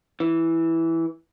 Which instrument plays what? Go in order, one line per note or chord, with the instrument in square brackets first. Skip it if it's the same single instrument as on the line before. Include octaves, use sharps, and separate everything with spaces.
[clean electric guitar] E3